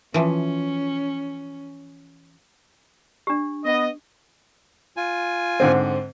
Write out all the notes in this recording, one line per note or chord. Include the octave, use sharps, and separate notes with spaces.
E3 F3 C#4
D4 G4
B3 D#5
F4 G#5
G#2 D3 C4